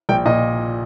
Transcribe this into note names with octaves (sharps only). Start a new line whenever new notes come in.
A#1 G5
A#2 D#5